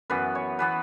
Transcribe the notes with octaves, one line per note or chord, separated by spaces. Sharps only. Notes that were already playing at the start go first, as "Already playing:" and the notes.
F#2 E3 B3 B4
C#5
E3 B3 B4